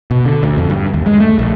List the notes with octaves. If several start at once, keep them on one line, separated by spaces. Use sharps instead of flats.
B2
D3
D2
F2
G2
D#2
G#3
A3
A#1